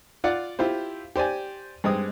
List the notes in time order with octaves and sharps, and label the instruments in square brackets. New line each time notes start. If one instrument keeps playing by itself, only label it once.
[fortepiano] F4 D5 F#5
E4 F4 G4 C5
G4 C5 D5 G#5
G2 G#3 C4 D#6